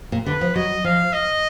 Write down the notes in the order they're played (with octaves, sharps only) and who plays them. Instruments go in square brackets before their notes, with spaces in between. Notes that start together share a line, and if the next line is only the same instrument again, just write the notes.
[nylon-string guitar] A#2
[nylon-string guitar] D3 [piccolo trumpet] B4
[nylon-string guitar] F3
[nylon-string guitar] F#3 [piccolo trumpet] D#5
[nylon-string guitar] F3 [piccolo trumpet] F5
[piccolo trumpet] D#5